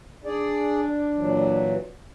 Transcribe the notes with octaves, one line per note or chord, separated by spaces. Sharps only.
D4 G#4 D5
A#2 E3 F#3